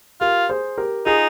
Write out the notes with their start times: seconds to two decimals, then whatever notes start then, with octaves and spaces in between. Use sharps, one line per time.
0.21 F4 G4 A#4
0.49 G#4 C5
0.78 G4 A#4
1.06 D#4 F4 G#4